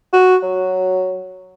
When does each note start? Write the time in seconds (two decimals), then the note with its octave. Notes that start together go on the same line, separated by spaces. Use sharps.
0.13 F#4
0.43 F#3